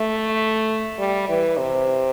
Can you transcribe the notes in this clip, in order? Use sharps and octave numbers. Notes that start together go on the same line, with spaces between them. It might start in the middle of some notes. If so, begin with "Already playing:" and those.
Already playing: A3
G3
E3
C3